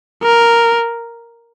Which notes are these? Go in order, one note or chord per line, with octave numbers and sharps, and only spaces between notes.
A#4